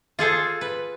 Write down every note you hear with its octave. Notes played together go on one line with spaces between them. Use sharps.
F4 G#4 A4 C5
B4